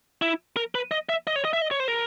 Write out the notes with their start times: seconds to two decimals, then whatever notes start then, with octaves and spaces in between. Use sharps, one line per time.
0.22 E4
0.57 A#4
0.75 B4
0.91 D#5
1.09 E5
1.27 D#5
1.36 C#5
1.45 D#5
1.53 E5
1.62 D#5
1.71 C#5
1.80 C5
1.88 A#4